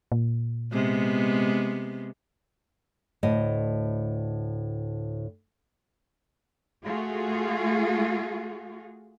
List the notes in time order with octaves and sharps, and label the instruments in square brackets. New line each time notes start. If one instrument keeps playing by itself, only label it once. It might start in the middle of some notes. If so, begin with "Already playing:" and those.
[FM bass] A#2
[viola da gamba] C3 G#3 B3
[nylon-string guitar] D2 A2 D#5
[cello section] A3 F4 F#4 G#4